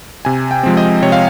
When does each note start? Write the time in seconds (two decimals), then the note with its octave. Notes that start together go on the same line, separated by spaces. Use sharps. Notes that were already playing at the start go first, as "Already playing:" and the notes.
0.25 C3 G#5
0.51 G5
0.63 F3 G#3 C4
0.77 D#5
1.02 C3 C#5
1.12 F5